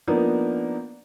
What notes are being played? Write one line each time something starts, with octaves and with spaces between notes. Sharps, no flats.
F3 A#3 B3 D4 D#4